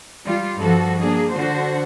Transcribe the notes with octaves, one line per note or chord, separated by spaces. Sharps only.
G3 F4
G2 F3 F#4 A4
A#3 D4 G#4
D3 F#4 C5